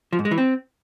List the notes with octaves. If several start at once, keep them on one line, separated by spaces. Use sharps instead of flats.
F3
G#2
G#3
E3
C4